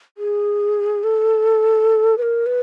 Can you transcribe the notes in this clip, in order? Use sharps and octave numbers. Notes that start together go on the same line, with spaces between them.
G#4
A4
B4
A#4
B4